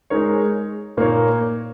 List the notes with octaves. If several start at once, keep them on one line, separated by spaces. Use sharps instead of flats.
G#3 D#4 A#4 C#5
A#2 A#3 D#4 A#4 C#5